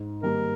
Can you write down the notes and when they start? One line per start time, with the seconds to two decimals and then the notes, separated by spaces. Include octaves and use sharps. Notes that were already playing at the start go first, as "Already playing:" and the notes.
Already playing: G#2
0.23 D#3 G3 A#3 A#4